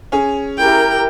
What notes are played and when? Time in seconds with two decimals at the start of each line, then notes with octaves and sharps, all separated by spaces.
0.12 C#4 G#4
0.58 E4 G4 A#4 G5